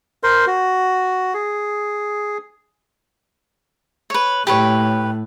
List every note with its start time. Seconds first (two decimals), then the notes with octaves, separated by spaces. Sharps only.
0.23 A#4 C5 C6
0.47 F#4
1.34 G#4
4.10 B4 C#5
4.47 A2 G4 B4 C#5